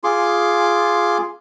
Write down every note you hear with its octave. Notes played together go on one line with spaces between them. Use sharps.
F4 G#4 C6 D6